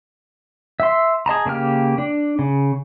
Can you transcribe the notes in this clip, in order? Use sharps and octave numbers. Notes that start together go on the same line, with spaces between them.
E5 C6
G#4 D#5 A5 A#5
C#3 A#3 G4 F6
D4
C#3